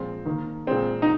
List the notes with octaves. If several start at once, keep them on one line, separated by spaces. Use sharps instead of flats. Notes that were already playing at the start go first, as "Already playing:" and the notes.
Already playing: A#2 F3 G#3 C4
D#3 A#3
A#2 G#3 C4
D#4